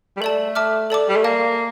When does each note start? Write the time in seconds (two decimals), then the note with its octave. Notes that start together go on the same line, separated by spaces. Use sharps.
0.17 G3
0.21 A3 A4 D5 A5
0.55 E5 A5 D6 F6
0.90 A4 D5 A5 D6
1.09 G3
1.16 A3
1.24 A#3 D5 F5 A5